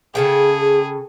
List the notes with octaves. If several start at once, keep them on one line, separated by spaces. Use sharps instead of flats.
C#3 G#4 A4 G5